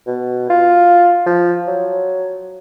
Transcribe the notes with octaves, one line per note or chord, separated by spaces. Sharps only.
B2
F4
F3
F#3